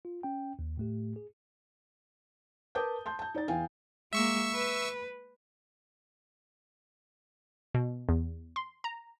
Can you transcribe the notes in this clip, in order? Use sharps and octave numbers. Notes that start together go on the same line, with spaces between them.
F4
C#4 G5
D#2
A2 A3 G4
G#4
A#4 B4 A5 D6 D#6 G6
A5 C6 G6
A5 G6
D#4 D5 A6
E2 F5 G5 G#5
G#3 A#3 E5 C#6 E6
B4
B2
E2
C6
A#5